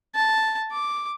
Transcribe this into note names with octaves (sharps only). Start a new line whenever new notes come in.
A5
D6